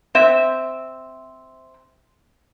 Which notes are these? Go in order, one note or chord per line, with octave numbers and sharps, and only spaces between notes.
C4 E5